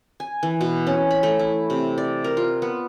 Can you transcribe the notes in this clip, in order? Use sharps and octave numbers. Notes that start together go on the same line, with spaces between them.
G#5
E3
B2
C#4
B5
A3
E4
C3
D5
A#4
F4
B3